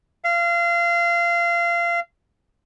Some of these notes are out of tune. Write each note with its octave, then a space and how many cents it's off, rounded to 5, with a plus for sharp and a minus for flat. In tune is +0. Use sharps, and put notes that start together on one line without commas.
F5 -25